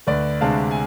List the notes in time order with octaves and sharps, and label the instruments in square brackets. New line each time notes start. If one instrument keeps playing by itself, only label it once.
[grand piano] D2 B4 D5
C3 G#3 D4 F5 A5
G#5